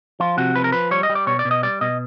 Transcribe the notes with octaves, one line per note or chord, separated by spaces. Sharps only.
F3 F4
C3 F#4
F3 B4
A#4
F3 B4
G3 C#5
D#5
G3
D5
B2 C#5
D5
B2
D#5
G3 D5
B2 D#5